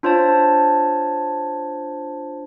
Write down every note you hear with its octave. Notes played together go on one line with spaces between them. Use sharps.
D4 F4 C5 C#5 A5